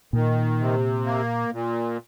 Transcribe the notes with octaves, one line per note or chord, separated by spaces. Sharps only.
A#2 D#3
C3
A#3
A#2